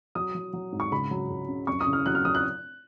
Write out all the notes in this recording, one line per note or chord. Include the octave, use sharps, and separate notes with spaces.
F#3 D#6
F#3
F#3
G#2
C#6
C#2 B5
F#3
C#2
C#3
F#2 C#6
D#6
C#3
F6
F#3 F#6
F6
F#3 D#6
F#6